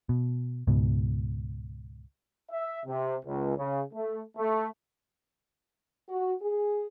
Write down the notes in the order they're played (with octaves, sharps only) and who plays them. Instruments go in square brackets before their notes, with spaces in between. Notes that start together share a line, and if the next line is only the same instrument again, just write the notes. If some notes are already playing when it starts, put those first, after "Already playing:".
[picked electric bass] B2
C#2 G#2 B2
[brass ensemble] E5
C3
C#2
C#3
A3
A3
[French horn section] F#4
G#4